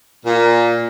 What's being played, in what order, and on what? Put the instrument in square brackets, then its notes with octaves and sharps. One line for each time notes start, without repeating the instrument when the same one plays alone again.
[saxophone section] A#2